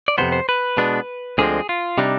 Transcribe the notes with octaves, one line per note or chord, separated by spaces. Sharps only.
D5
F2 C3 F3 B3 C5
C5
B4
B2 G#3 B3 D4
D2 D3 F3 G#3 C4 G#4
F4
C3 G3 D4 D#4